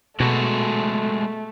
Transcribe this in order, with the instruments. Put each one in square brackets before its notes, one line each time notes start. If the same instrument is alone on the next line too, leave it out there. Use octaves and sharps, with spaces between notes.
[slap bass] B2 [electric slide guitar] G#3 F#4 A4 [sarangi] A3